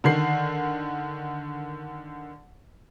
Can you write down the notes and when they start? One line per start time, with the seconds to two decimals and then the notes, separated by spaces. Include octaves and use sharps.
0.04 D3 D#3 C7